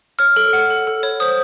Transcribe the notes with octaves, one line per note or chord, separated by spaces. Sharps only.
C#5 F6
A4
F#5
A4
A4
C#5
C5 D#6